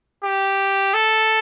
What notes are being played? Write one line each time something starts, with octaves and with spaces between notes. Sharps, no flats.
G4
A4